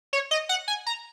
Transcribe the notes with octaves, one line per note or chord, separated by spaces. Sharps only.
C#5
D#5
F#5
G#5
A#5